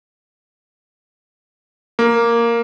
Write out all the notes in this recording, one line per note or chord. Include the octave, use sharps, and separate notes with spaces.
A#3